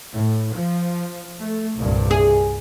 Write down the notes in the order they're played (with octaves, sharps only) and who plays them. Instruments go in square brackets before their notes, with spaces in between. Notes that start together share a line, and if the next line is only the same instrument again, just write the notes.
[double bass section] A2
F3
A3
C2 G2 A#2
[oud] G#4